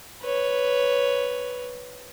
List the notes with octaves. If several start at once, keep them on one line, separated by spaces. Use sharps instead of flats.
B4 C#5